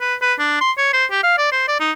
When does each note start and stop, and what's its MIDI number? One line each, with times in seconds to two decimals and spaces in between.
0.01 0.15 71
0.22 0.34 71
0.39 0.60 62
0.61 0.72 84
0.78 0.91 73
0.93 1.05 72
1.11 1.22 67
1.23 1.35 77
1.38 1.50 74
1.52 1.66 72
1.68 1.77 74
1.80 1.92 63